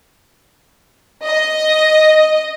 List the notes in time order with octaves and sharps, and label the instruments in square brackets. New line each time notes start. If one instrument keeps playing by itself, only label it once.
[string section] D#5